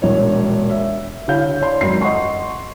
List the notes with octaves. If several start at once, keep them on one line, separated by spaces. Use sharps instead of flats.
E1 A#1 C#5
E5
D3 E4 C#5 F5 G6
C#5 D5 C6
G#1 F#2 B5 C7
D#5 F#5 C6 C#6